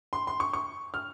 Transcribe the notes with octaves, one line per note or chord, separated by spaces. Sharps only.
C6
C6
C#6
C#6
F6